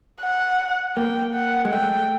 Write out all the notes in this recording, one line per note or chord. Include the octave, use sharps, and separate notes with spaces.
F#5
A#3 G5
F#5
G#3
A3 G5